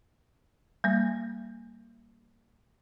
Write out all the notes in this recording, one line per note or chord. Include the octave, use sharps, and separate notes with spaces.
G3 A#3